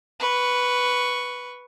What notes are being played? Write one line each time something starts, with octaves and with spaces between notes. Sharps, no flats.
B4 C#6